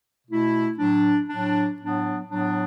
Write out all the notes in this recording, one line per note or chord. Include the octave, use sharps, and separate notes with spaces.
B2 A3 E4
A2 F#3 D4
A2 F#3 D4
A2 F#3 B3 D4
A2 F#3 B3 D4